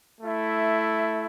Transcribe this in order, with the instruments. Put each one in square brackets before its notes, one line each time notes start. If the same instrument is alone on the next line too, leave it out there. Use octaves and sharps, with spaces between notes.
[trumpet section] A3 E4